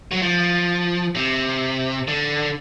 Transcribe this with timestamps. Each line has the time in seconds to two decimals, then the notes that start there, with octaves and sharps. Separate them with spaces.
0.11 F#3
0.22 F3
1.16 C3
2.08 D3